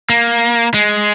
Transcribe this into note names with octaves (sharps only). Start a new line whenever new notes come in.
A#3
G#3